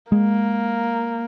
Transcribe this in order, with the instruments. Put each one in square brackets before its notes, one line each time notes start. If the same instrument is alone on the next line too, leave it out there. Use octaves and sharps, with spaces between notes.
[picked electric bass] G#3 [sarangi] A#3